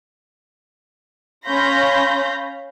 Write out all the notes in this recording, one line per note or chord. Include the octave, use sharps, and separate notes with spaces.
C#4 F5 B5 C6 G6 A#6